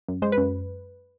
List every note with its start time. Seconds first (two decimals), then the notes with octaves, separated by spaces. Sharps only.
0.08 F#2
0.22 G#3 C5
0.32 B4
0.38 F#2